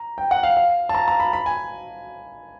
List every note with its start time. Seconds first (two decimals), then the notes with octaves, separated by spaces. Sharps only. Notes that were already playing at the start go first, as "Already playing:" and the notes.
Already playing: A#5
0.18 G5
0.31 F#5
0.43 F5
0.57 F5
0.89 A5
0.95 A#5
1.08 A#5
1.20 B5
1.33 B5
1.46 G#5